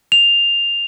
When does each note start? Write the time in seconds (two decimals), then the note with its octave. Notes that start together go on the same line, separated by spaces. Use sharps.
0.12 F7